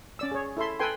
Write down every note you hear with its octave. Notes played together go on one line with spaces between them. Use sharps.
C#4 D5 E6
G#4 C#5
E4 A4 E5 C6
A4 B4 G5 G#5 C6